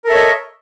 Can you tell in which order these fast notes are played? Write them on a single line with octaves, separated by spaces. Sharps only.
A#4 A4 E5 C#5 D#5